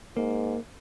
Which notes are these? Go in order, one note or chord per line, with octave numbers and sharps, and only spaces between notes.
G#2 A#3